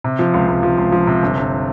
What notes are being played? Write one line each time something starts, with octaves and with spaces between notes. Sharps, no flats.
C3
F3
C#2
C#2
F3
C#2
F3
C3
G1
G1